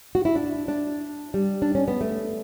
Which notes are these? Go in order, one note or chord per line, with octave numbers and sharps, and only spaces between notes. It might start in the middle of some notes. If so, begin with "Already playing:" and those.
F#4
E4
D4
D4
G3
D4
C#4
B3
A3